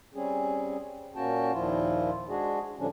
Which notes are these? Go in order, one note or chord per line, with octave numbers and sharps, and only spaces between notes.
G3 C4 C#4 G#4
A#2 A#3 C#4 F#4 G5 A5
D#2 A#2 F3 E4 F4
G#3 D4 F#4 G#4
A2 D3 F3 G3 C#4 D4